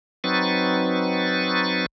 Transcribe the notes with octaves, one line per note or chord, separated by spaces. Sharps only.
F#3 C4 D#4 B4 C#6 A6